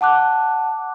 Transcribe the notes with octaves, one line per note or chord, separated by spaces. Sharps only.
F#5 A5 D6 F#6